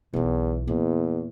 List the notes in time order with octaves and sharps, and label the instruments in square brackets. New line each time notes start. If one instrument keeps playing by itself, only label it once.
[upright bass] B1 E3 [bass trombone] E2
[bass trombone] E2 [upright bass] A#2